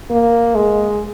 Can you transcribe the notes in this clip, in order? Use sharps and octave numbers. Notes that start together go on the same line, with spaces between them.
A#3
G#3